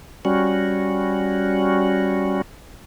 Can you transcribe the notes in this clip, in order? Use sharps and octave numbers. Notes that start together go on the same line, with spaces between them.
G3 C#4 F#4